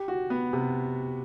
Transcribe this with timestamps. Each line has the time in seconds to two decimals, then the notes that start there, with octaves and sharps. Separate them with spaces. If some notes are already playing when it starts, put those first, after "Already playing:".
Already playing: G4
0.08 F#4
0.30 B3
0.53 C3